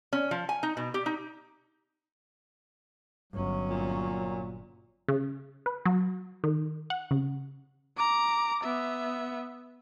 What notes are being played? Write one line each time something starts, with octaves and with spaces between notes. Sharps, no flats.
C#4
F3
G#5
D#4
B2
G4
D#4
G1 F#3 C#4
A#2
C#3
B4
F#3
D#3
F#5
C#3
A#5 D6
B3 E5